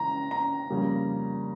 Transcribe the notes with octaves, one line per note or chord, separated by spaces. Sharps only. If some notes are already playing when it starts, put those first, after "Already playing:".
Already playing: C#3 E3 G#3 C#4 A#5
A#5
F2 C#3 G3 A#3